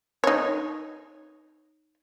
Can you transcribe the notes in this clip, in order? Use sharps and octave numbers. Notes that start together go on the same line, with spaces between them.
D#4 C#5